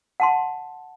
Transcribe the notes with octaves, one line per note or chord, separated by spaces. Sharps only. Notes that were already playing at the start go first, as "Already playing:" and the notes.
F#5 A5 C6